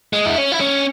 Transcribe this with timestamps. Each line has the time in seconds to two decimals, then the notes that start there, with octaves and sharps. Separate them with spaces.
0.13 G#3
0.26 E4
0.38 C#4
0.52 E4
0.61 C#4